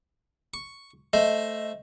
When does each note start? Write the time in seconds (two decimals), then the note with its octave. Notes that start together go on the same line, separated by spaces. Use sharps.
0.54 C#6
1.13 A3 C5 D#5